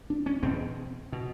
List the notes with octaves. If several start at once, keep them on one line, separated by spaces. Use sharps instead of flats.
D4
C#4
E2 B2 C4
B2